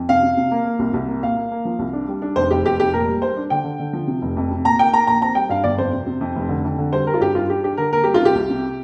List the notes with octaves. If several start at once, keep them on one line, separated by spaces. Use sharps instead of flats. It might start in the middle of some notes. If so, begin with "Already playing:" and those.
Already playing: F2
C3 F5
C3
C3
A#3
A#3
C2
C2
A#3
A#2 F5
A#3
A#3
F3
C2
D4
G3
D4
F1 C5
F1 G4
F1 G4
F1 G4
A#2 A#4
G3
G3 C5
D4
D3 G5
D3
D3
F3
C3
F1
F2
C3
A#2 A#5
A#3 G5
A#3 A#5
A#1 A#5
C4 A#5
G3 G5
G2 F5
G1 D5
F2 C5
C3
C3
F2
F1
D3
F2
D3
G3 C5
G3 A#4
F4
G2 G4
G3 F4
D4 G4
D4 G4
D3 A#4
A#3 A#4
G3 G4
F4
C3 G4
C2
C3